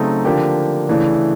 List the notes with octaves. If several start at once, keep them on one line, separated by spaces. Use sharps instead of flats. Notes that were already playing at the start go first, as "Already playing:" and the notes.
Already playing: C#3 F#3 A3 C4 D#4
D3 F3 A#3 D4 G4
C#3 E3 A3 D4